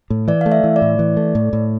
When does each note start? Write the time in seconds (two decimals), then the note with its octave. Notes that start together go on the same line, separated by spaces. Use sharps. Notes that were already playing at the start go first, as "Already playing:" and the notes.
0.10 A2
0.28 E3 D5
0.41 A3 F5
0.52 E5
0.64 E3
0.76 D5
0.82 A2
0.99 E3
1.17 A3
1.35 A2
1.53 A2